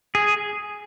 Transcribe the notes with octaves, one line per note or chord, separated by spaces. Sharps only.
G#4